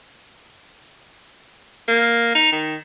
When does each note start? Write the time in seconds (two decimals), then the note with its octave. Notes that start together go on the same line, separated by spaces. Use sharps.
1.88 A#3
2.35 D#4
2.52 D#3